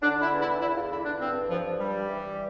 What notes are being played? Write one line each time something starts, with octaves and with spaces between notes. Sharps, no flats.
D3 D4
E4
E2
E4
E2 E4
F4
D3 E4
D4
G2 C4
G2 F3
G2 G3
E3